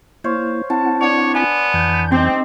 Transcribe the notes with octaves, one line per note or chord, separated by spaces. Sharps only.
A#3 E4 C5 C#5 F5
C4 E4 F#5 A5
D4 C#5
B3 G#5
F2 E3 G6
C4 D#4 G4